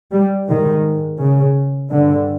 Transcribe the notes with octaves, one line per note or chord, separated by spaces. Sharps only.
G3
G#2 D#3
C#3
G2 D3